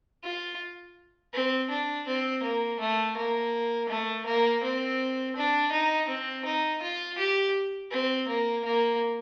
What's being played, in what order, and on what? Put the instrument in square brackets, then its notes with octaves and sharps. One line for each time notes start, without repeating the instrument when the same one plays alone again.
[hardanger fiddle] F4
C4
D4
C4
A#3
A3
A#3
A3
A#3
C4
D4
D#4
C4
D#4
F4
G4
C4
A#3
A#3